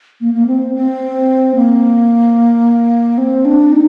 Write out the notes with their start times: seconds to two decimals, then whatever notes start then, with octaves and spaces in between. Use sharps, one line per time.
0.21 A#3
0.34 A#3
0.47 C4
0.75 C4
1.55 A#3
3.18 C4
3.45 D4
3.72 D#4